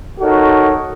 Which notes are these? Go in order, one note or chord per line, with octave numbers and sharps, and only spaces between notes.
D#4 F#4 A4 A#4 C#5